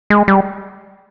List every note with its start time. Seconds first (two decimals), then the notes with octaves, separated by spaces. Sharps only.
0.10 G#3
0.28 G3